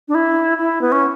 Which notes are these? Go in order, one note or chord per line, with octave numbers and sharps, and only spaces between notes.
D4
E4
E4
B3
C#4